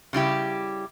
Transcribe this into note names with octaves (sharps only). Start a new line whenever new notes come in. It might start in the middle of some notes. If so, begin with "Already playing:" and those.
C#3 G3 E4 G4